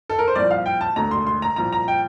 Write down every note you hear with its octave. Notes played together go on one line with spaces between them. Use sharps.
A4
A#4
C5
C2 A#2 F3 D5
F5
G5
A5
E1 D2 D3 A#5
C6
C6
A#5
C2 A#2 F3 A#5
A#5
G5